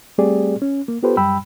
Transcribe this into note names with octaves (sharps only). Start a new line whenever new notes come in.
G3 A3 C4 G4 G#4 D5
C#4
A#3
B3 F4 G4 A4 B4 C5
F#2 G3 G5 B5 E6